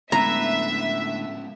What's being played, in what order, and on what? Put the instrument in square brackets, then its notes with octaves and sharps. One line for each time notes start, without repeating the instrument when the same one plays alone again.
[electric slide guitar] A2 D3 B4 [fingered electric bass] G#3 B3 C#4 [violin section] E5 [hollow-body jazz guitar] A#5